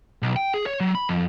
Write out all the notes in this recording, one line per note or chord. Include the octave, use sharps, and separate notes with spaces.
B1
G5
G#4
C#5
F#3
B5
F2